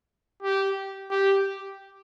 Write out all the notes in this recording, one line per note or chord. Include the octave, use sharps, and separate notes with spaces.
G4
G4